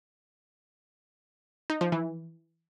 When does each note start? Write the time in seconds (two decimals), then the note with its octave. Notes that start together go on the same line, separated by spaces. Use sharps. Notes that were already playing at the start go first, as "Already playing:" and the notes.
1.70 D#4
1.81 F3
1.92 E3